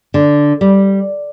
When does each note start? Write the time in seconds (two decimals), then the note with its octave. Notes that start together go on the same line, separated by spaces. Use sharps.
0.14 D3
0.61 G3